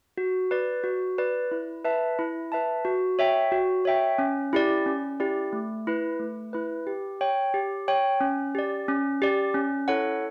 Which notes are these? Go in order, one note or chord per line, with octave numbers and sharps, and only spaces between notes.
F#4
B4 D5
F#4
B4 D5
E4
B4 E5 A5
E4
B4 E5 A5
F#4
C#5 E5 G5
F#4
C#5 E5 G5
C#4
E4 G4 D5
C#4
E4 G4 D5
A3
E4 B4
A3
E4 B4
G4
C#5 G5
G4
C#5 G5
C#4
G4 D5
C#4
G4 D5
C#4
E4 A4 C#5 F#5